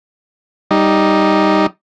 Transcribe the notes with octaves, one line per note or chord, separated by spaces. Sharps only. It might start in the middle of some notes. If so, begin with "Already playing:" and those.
G3 D#4